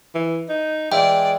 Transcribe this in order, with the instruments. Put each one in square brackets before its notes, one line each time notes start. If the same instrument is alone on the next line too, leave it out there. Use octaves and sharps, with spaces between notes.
[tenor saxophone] E3
D#4
[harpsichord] E3 E4 F4 [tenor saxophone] G#3 [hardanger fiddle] D5 [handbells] G5